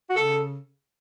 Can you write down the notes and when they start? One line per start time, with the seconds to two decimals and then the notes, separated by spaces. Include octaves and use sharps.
0.10 F#4
0.15 C#3 A4